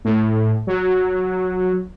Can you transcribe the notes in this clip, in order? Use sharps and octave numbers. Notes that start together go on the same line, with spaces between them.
A2
F#3